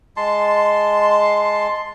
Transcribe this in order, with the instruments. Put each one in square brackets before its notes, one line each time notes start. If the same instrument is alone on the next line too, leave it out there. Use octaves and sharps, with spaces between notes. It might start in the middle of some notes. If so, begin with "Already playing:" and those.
[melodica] G#3 A5 C6